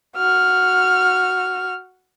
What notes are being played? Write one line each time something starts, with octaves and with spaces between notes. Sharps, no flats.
F#4 F6